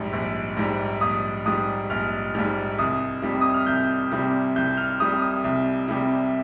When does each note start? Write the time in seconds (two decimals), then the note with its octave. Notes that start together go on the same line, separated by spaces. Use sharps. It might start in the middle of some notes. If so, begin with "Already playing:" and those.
Already playing: A#1 G#2 G3
0.13 A#1
0.57 G#2 G3
1.01 A#1 D#6
1.46 G#2 G3 D#6
1.90 A#1 F6
2.35 G#2 G3 F6
2.78 C2 D#6
3.22 C3 G3
3.41 D#6
3.54 F6
3.66 C2 G6
4.12 C3 G3
4.56 C2 G6
4.77 F6
5.00 C3 G3 D#6
5.22 D#6
5.44 C2
5.88 C3 G3